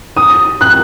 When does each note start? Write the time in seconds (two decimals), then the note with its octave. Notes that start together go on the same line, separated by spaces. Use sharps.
0.16 D#6
0.61 F#6